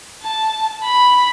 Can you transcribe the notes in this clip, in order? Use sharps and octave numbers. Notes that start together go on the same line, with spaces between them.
A5
B5